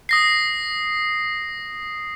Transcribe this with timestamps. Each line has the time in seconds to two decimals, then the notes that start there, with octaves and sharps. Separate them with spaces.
0.09 D#6 A#6 C7